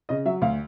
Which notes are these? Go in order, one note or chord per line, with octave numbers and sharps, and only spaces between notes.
C#3 D#5
F#3 E5
D2 F5